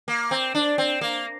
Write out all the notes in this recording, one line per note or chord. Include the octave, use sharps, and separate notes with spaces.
A#3
C4
D4
C4
A#3